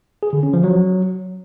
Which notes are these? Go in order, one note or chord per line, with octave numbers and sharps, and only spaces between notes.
G#4
D3
C#4
F3
F#3